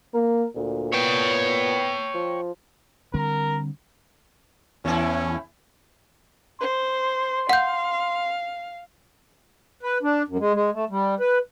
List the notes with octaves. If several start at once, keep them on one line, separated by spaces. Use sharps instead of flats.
A#3 A#4
D2 A#2
B3 C#5 G5
F3
D3 G3 C4 A#4
E2 A2 E3 C#4 E4
C5 C6
F5 F#5 G6
B4
D4
F#2
G#3
G#3
A3
G3
B4